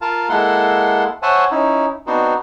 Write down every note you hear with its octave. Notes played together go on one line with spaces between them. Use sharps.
F4 A#4 F5 A5
G#3 A#3 E4 A4 F#5 C6
C5 C#5 E5 F#5 G#5 A5
C#4 D#4 E4
B3 C4 D4 D#4 F#4 C5